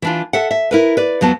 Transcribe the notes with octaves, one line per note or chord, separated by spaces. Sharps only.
E3 D4 F4
A4 E5 F#5
E5
E4 A#4 B4
B4 D5
F2 F#3 B3 A5